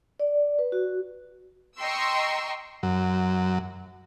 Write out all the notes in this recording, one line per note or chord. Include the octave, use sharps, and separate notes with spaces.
D5
B4
F#4
D#5 G5 A#5 C6 C#6 E6
F#2